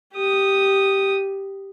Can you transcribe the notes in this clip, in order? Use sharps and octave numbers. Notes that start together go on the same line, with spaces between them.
G4 D#6